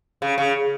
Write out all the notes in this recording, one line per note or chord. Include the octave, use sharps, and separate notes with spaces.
C#3
C#3